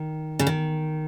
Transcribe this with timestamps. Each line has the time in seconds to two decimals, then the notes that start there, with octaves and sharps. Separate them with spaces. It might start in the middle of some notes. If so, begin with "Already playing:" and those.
Already playing: D#3
0.39 C#3
0.47 D#3